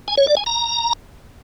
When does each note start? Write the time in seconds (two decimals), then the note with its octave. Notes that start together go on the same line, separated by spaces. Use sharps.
0.08 G#5
0.17 C#5
0.27 D5
0.37 G#5
0.46 A#5